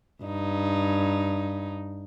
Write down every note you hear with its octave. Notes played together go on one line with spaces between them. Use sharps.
G2 D#4